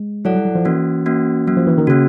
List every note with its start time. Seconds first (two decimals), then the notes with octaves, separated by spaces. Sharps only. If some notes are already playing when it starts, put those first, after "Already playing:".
Already playing: G#3
0.25 F#3 E4 A4 D5 F#5
0.35 G3
0.45 F#3
0.55 F3
0.65 E3 A#3 C#4 F#4
1.06 A#3 C#4 F#4
1.47 F#3 A#3 C#4 F#4
1.57 F3
1.67 E3
1.78 D#3
1.87 C#3 A#3 C#4 F#4